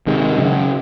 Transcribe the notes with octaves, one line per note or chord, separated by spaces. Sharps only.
C3 D#3 G#3
C#3 F#3 C#4